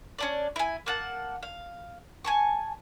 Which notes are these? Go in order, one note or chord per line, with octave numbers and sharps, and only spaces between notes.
C#4 D4 D5
E4 G#5
A#3 F#5 A5
F5
G#5 A5 C#6